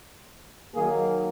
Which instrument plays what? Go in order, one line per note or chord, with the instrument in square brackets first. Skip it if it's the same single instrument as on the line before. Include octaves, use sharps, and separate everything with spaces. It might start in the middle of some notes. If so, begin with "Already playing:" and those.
[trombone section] D#3 F#3 A#3 G#4